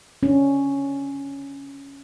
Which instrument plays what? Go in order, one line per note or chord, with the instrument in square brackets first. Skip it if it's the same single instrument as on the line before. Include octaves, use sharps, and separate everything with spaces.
[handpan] C#4 D4